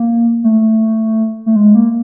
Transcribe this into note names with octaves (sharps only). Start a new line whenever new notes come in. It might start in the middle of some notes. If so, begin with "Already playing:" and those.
Already playing: A#3
A3
A3
G#3
A#3